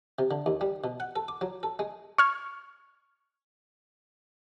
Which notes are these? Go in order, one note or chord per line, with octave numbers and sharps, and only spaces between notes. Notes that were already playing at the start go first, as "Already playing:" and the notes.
C3
D3
D#2
G3
B2
F#5
A4
D6
F#3
A4
G#3
C#6 F6 G#6